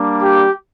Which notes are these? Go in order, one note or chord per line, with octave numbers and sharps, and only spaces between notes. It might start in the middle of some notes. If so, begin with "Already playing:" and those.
Already playing: G3 A#3 D4
G4